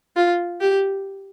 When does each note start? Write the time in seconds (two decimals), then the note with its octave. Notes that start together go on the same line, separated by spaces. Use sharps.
0.16 F4
0.61 G4